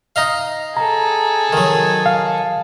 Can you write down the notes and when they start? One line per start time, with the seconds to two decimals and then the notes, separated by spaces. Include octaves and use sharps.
0.16 D#4 D#5 F5
0.77 G#4 A4 A#5
1.53 D#3 F#3
2.06 F5